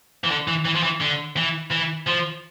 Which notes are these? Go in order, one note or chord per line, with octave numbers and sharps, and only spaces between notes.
E3
D3
E3
E3
F3
E3
D3
E3
E3
F3